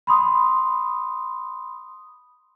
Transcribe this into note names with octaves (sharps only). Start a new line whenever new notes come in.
B5 C6 D#6